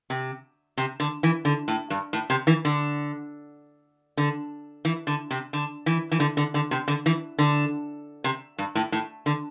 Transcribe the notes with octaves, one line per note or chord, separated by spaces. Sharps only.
C3
C3
D3
E3
D3
A2
G2
A2
C3
E3
D3
D3
E3
D3
C3
D3
E3
E3
D3
D3
D3
C3
D3
E3
D3
C3
G2
A2
A2
D3